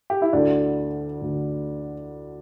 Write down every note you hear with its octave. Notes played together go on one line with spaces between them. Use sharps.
G4
E4
D2 D3 D4
D2 D3